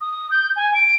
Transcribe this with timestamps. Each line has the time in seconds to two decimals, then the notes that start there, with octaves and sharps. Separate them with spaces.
0.01 D#6
0.31 G6
0.56 G#5
0.74 D7